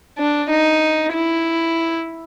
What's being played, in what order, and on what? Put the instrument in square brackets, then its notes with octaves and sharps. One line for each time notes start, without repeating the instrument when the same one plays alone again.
[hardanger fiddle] D4
D#4
E4